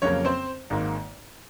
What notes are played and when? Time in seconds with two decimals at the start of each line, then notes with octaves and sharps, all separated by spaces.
0.02 F2 C#3 F#3 A#3 C#4 C#5
0.25 C4 C5
0.70 G#1 G#2 D#3 A#3